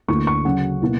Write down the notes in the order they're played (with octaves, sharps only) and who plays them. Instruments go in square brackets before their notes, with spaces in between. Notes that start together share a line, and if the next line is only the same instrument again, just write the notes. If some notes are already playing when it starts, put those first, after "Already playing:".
[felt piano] D2 D3 A#3 E4 C#6
C#6
C#3 F#3 C#4 F#5
B2 A#3 E4